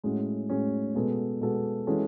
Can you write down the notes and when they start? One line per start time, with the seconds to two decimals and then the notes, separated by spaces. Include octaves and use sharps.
0.04 A2 G#3 C#4 F#4
0.50 A2 G#3 C#4 F#4
0.95 B2 G#3 B3 F#4 A4
1.41 B2 G#3 B3 F#4 A4
1.87 E3 G#3 C#4 F#4 A4